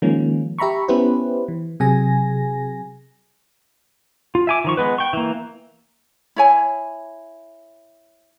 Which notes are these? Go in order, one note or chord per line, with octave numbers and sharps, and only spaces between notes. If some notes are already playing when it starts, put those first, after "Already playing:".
D#3 F3 G#3 A#3 C#4
G4 E5 A#5 B5 C#6
B3 C#4 E4 G4 B4 C5
E3
C3 F#3 G#4 G#5 A#6
F4
E5 G#5 D6
D#3 F3 C#6
G#3 B3 B4
G5 C#6
E3 A#3
E4 C#5 G#5